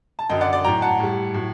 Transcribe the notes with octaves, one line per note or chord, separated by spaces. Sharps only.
A5
F#2 D3 F#3 D#5 G5
D5 F#5
D5
A2 F#3 G5 A#5
F#5 A5
A2 G3
A2 F#3